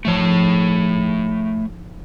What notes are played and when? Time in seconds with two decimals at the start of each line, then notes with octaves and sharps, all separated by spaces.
0.05 G#2 F3 A3 C#5